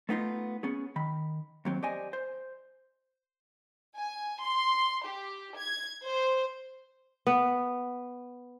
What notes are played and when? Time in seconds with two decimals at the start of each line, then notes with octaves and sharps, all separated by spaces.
0.09 A3 B3 D#4 F4
0.63 B3 C#4 G#4
0.96 D#3 B5
1.65 D#2 F#3 C4
1.83 G4 C5 D5 D#5 G#5
2.13 C5
3.96 G#5
4.43 C6
5.05 G4
5.59 G#6
6.03 C5
7.27 B3